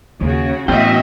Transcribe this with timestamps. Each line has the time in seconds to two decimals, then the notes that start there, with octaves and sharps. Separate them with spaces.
0.21 D#2 C#3 F#4
0.68 A2 E3 B3 C#4 F#4 D#5 E5 G5